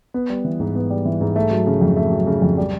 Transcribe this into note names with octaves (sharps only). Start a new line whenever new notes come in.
B3
G3
E3
G#2
B3
G3
E3
G#2
A3
F#3
C#3
F2
A3
F#3
C#3
F2
G3